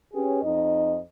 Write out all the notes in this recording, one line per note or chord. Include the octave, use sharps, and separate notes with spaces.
C#4 G4 G#4 B4 C#5
F2 D#4 D#5